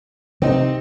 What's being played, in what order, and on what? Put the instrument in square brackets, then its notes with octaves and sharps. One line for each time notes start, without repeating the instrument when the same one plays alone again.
[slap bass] C3 [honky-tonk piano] C4 D#4